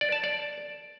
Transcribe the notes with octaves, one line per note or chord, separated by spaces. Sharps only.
D5
A5
D5